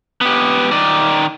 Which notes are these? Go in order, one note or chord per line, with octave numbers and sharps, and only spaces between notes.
B3 G4
D#3 D5